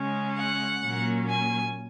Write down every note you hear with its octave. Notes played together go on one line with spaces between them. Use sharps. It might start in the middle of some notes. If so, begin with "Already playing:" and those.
Already playing: C#3 G#3 C#4
F#5
A#2 F#3 A#3 C#4
G#5